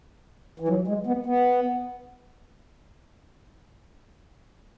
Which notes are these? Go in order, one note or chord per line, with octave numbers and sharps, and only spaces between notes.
E3
F#3
G#3
B3
B3